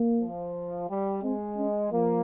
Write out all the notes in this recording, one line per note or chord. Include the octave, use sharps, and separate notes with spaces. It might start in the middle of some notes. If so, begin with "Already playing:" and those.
Already playing: A#3
F3
G3
G#3 C4
C#4
F3 A#3